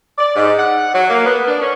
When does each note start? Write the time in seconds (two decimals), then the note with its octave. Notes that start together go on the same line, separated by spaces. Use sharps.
0.18 D5
0.36 G#2
0.58 F#5
0.94 F#3
1.09 A#3
1.25 B3
1.48 D4
1.61 C#4